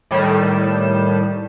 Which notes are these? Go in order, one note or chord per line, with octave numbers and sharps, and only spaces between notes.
A2 D#3 G3 E7